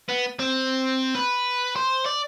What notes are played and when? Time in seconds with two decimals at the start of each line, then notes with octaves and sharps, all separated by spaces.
0.09 B3
0.39 C4
1.15 B4
1.76 C5
2.05 D5